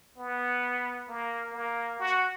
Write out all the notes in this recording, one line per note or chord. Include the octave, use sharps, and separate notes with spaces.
B3
A#3
A#3
F#4